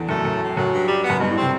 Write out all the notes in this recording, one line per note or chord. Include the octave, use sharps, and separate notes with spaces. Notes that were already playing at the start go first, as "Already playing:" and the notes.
Already playing: E2 D3
F#2 A3
F#2 A2
A2
F#2 F#3
G2
G3
B3
F#2
G2 B2
A2
C4
C3